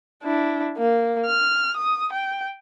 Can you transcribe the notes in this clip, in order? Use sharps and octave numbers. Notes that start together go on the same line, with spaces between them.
D4 E4
A#3
F6
D#6
G5